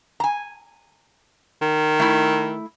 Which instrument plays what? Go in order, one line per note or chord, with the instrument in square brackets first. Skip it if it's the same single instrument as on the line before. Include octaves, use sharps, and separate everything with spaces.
[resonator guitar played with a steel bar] G#5 A#5
[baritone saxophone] D#3
[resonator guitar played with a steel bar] A3 E4